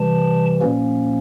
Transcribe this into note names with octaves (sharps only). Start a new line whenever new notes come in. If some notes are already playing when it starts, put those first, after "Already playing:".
Already playing: C3 E3 G3 A5
A#2 F3 A#3 C#4